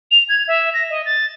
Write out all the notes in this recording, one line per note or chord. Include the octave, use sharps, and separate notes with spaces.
F7
G#6
E5
A#6
D#5
A6